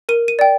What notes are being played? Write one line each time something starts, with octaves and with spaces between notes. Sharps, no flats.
A#4 D#7
D#7
D5 G5